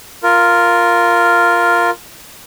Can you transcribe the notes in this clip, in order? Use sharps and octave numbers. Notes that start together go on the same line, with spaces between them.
F4 A#4